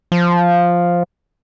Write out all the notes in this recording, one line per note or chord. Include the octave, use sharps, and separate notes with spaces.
F3